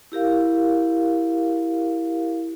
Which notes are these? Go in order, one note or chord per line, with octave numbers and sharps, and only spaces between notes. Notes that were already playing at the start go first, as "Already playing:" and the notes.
E4 G4 A#4 F5